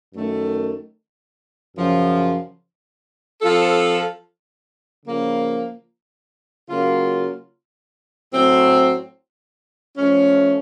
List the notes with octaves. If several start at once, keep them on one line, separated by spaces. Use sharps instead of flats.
F#2 D#3 A3
F#2 C#3 F3
F3 C4 F4 A4
C#3 F3 A#3
C#3 F#3 A#3 F4
A2 F#3 C4
F3 A3 C#4